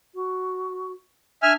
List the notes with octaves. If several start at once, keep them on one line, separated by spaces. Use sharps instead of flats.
F#4
D4 E5 G#5 F6